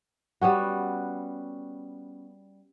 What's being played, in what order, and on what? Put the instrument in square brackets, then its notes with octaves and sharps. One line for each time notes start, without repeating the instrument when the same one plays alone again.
[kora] G3 B3 C#4 F#4